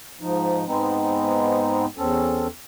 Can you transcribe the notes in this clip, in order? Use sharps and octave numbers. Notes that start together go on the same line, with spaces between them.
G#2 F3 D#4
G#2 G#3 B3 C4 D#4
E2 C4 C#4 A4